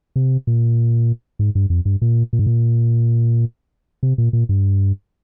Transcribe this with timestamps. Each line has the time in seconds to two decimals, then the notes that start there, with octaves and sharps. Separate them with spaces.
0.16 C3
0.47 A#2
1.39 G#2
1.55 G2
1.70 F2
1.85 G2
2.02 A#2
2.33 A#2
2.39 G#2
2.47 A#2
4.03 C3
4.18 A#2
4.33 A#2
4.49 G2